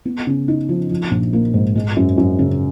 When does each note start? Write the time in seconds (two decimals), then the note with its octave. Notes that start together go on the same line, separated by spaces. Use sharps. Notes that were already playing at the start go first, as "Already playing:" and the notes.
0.05 B3
0.27 C#3
0.48 D#4
0.69 F3
0.90 F3
1.11 A#1
1.33 A#3
1.54 G#2
1.76 G#3
1.97 F#2
2.18 F#2
2.39 C#3